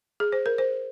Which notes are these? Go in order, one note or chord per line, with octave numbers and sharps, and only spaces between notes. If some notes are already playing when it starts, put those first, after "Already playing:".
G#4
C5
A#4
C5